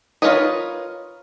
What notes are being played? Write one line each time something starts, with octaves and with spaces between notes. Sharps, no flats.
F4 A#4 B4 C#5 D#5